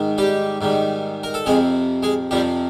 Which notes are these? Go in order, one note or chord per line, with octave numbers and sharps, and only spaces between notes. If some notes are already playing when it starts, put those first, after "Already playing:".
Already playing: G#2 D#3
G3 G4
G#2 D#3 G3
A#4
A4
F2 C3 F3 G#3 G#4
G#3 G#4
F2 C3 F3 G3 G4